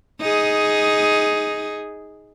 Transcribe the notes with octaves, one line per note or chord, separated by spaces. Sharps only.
D#4 G#4